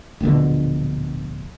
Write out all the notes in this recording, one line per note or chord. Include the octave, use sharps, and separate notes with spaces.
D1 A#1 B2 D3